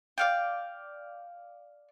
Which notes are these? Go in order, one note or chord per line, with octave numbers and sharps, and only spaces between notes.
D5 F5 G5